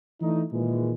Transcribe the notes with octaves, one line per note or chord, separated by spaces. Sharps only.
E3 A3 D4 D#4
A#2 D#3 E3 G#3